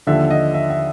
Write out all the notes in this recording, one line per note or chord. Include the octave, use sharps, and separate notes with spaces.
D#2 D3 F3 E5
D#5
E5
E5